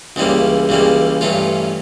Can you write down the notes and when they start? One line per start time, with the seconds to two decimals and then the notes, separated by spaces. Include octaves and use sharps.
0.16 C#2 C#3 E3 G3 A#3
0.69 C#2 C#3 E3 G3 A#3
1.21 G2 E3 A3 C#4 F4